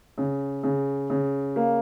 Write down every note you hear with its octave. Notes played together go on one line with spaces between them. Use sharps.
C#3
C#3
C#3
A#3